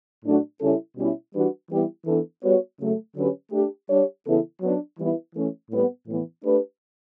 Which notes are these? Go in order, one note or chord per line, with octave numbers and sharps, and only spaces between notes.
A2 F#3 A3 D4 F#4
C#3 G3 C#4 E4 A4
B2 G3 C#4 E4
E3 G3 D4 F#4 B4
E3 G3 B3 E4 G4
E3 B3 D4 A4
G3 B3 F#4 C#5
C#3 F#3 A3
D3 F#3 C#4 G4 B4
A3 D4 G4
G3 D4 G4 C#5
C#3 E3 B3 E4 A4
F#3 B3 D4
E3 G3 B3 E4 B4
E3 A3 C#4
A2 G3 B3
A2 E3 B3
A3 D4 G4 B4